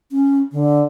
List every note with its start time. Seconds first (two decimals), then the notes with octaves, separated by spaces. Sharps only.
0.12 C#4
0.52 D3